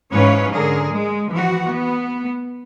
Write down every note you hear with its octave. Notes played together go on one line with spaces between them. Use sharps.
G#2 E3 C#4 B4 C#5 F5
D3 G#4 A#4
G#3
E3 F3 F#4
B3